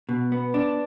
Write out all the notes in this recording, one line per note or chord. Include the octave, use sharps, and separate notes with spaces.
B2
B3
D4